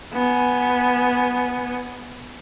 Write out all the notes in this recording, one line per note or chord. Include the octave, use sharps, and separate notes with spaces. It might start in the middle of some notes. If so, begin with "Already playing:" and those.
B3 G#5